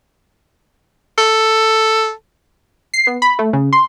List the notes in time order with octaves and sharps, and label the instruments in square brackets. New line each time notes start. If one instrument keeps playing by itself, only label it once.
[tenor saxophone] A4
[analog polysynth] C7
B3
B5
A3
C#3
C6